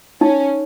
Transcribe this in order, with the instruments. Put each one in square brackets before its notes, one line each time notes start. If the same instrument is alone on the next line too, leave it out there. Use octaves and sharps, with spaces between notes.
[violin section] C#4 [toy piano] D#4